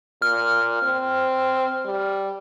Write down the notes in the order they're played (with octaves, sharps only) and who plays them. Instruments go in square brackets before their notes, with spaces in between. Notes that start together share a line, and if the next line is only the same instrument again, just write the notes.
[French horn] A#2 [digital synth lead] F6
[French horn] C4
G3